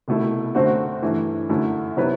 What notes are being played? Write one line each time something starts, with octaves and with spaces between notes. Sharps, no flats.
C2 B2 A3 E4
F#2 D3 A3 C4 F#4
G2 E3 A3
F#2 D3 A3 E4
C3 F#3 B3 E4 B4